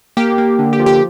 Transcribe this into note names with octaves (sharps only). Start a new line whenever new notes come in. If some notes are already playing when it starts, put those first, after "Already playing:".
A#3 G4
A#3
D3
G4
F3
G4